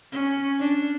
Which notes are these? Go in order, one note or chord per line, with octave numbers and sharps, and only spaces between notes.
C#4
D4